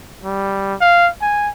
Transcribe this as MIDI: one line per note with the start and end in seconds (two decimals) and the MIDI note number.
0.24 0.74 55
0.81 1.09 77
1.22 1.50 80